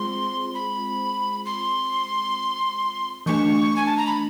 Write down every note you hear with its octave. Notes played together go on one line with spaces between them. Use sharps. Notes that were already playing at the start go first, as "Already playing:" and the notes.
Already playing: G#3 C4 F4 G#4 C5 C6
B5
C6
E3 A3 D4 C#6
G#5
A5
A#5
B5